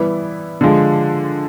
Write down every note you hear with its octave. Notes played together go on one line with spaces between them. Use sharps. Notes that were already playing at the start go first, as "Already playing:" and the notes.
Already playing: E3 G3 B3 E4
D3 F3 G#3